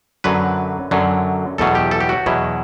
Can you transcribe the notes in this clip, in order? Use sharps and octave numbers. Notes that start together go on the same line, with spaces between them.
F#2 D3 F#3 B4
F#2 D3 F#3
E2 B2 F#3 A4
G4
A4
G4
F#4
E2 B2 F#3 E4